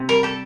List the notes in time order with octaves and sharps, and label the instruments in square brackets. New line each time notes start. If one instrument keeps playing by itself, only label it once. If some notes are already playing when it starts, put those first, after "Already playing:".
Already playing: [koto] C3 C4
[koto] G3 [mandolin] A#4
[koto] G4 [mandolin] A4